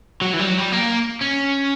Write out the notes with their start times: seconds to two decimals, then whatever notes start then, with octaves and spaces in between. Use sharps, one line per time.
0.22 F#3
0.33 E3
0.40 G3
0.47 F#3
0.59 G3
0.72 A#3
1.21 C#4